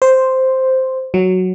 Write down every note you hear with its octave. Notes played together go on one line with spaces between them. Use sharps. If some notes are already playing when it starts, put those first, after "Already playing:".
C5
F#3